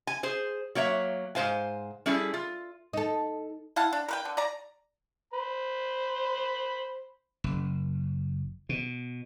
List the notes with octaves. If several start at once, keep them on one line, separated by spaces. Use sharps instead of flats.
G#5
G#4 C5
F#3 A#3 C#5 E5
G#2 G3 C5 F5 G#5
G3 C#4 E4 G#4 A4
F4
D#4 A4
E4 F5 F#5 A5
D4
A#4 B4 G5
D3
D5 A#5
C5 B5
F#1
B2